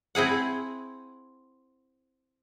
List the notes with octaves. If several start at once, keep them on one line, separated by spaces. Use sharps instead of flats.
C4 E4 G#4 F#5